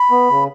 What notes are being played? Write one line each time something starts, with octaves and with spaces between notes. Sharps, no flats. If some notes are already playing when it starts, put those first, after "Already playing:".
Already playing: B5
B3
C#3